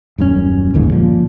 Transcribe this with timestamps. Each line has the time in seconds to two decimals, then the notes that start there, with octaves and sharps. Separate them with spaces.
0.18 D#1 F#2 G3 C#4
0.74 G1 D#2 G#2 C#3
0.92 A#2 F3